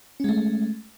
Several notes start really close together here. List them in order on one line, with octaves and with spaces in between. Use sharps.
C#4 G#3 A3